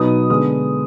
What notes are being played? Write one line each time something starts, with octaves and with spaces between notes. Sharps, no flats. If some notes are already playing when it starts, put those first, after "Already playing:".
Already playing: B2 F#3 B3 D#4 D#6
D3 G#3 B3 D#6